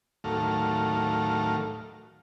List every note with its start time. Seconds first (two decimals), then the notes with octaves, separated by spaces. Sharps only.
0.24 D#2 A2 F#3 A3 A#4 F5